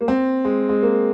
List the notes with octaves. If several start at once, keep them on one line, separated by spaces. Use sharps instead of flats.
A#3
C4
G#3
G#3
A#3